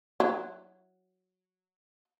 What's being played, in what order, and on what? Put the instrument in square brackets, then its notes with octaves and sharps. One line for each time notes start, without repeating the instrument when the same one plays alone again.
[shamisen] F#3 E4